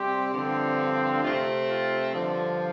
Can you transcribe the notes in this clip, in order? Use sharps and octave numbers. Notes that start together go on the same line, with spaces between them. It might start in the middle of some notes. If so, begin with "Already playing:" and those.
Already playing: C3 G3 C4 G4
G2 D3 F3 C4
C3 A3 C4 F4
F4
G2 D3 F3